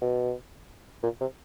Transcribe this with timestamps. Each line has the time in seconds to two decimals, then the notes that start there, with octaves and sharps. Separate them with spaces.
0.01 B2
1.03 A#2
1.20 C3